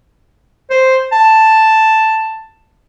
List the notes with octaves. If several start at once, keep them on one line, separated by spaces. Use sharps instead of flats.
C5
A5